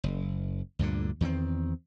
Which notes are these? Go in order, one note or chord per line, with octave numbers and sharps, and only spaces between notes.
F#1
D2 G2 A#2 D3
E2 D#3 A#3 C4